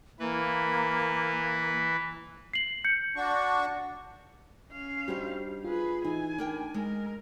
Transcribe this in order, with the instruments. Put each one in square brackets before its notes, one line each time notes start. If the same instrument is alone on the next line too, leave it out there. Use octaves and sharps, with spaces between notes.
[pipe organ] E3 B4 [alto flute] A#3
[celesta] C7 F#7
G6 C#7
[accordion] D4 F#4 C#6
[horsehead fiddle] C#4 F5
[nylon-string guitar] G3 D4 D#4 [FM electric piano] F#4 G4 C5
[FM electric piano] F4 [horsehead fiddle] G#4 B4
[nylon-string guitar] E3 [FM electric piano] D#4 [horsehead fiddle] G#5
[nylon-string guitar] D4 A#4 G5
[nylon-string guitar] G#3 [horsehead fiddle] A#4